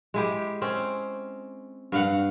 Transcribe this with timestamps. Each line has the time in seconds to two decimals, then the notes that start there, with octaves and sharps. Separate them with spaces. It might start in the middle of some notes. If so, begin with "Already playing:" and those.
0.14 G#3 E4 G4
0.62 C4 C#4
1.92 G2 F5 F#5